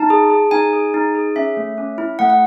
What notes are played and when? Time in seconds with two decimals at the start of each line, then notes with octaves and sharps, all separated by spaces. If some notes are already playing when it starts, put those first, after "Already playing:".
Already playing: D#4 A5
0.10 G#4
0.30 G#4
0.51 D#4 G#5
0.73 G#4
0.94 D#4
1.15 G#4
1.36 C#4 E5
1.57 A3
1.78 C#4
1.98 E4
2.19 A3 F#5
2.30 F#5